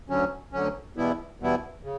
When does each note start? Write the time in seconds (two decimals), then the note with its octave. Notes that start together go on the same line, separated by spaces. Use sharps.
0.09 D2 D3 F#3 C#4
0.53 D2 D3 F#3 C#4
0.96 E2 B2 G3 B3 E4
1.40 E2 B2 G3 B3 E4
1.83 C#3